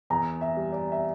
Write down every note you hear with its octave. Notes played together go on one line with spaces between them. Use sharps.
E2 A#5
E5
G3
D5
E5